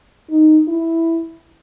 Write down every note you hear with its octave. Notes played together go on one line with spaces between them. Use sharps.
D#4
E4